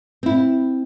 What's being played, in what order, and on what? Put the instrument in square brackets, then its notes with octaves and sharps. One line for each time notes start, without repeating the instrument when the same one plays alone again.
[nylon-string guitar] C4 E4